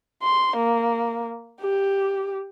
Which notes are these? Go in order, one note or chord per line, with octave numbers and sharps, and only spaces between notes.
C6
A#3
G4